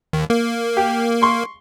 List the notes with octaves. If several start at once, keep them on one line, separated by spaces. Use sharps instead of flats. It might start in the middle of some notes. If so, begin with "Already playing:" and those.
D#2
A#3
G4
C6 C#6